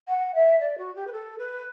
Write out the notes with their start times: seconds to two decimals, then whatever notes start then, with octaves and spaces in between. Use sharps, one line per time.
0.08 F#5
0.35 E5
0.60 D5
0.78 F#4
0.95 G4
1.07 B4
1.12 A4
1.38 B4